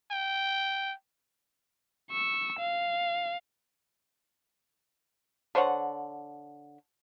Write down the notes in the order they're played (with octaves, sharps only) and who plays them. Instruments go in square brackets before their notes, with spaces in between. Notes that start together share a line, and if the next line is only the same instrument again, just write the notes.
[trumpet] G5
[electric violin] C#6 E6
F5
[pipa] D3 C5 C#5 F#5